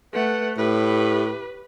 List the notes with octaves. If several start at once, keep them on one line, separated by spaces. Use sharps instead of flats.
A3 B4 F#5
A2 G4 B4